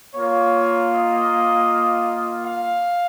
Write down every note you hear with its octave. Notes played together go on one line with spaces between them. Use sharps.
A#3 F4 C#5
D#5
F5